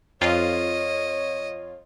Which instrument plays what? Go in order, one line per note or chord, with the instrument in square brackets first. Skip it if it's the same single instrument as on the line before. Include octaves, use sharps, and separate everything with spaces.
[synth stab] F2 F4 [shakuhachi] C#5 [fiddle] D#5